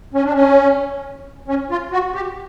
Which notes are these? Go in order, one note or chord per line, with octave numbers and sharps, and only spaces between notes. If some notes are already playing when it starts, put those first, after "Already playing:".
C#4
D4
C#4
C#4
F4
F#4
G4